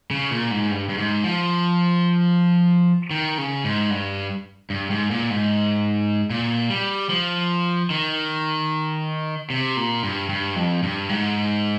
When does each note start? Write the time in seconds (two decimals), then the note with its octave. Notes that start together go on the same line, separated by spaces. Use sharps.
0.11 C#3
0.31 A#2
0.51 G#2
0.71 G2
0.89 G2
0.98 G#2
1.24 F3
3.11 D#3
3.38 C#3
3.64 G#2
3.90 G2
4.70 G2
4.90 G#2
5.11 A#2
5.30 G#2
6.30 A#2
6.70 G3
7.10 F3
7.90 D#3
9.50 C3
9.77 A#2
10.03 G2
10.29 G2
10.56 F2
10.83 G2
11.09 G#2